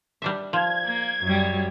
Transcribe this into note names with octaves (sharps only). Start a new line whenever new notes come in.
G3 D4 E5
F3 G#6
A#3
F#2 G3